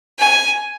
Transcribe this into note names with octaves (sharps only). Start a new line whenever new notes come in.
G#5